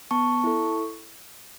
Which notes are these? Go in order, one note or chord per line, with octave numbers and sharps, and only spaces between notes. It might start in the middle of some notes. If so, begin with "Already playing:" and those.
B3 A5 C#6
E4 A4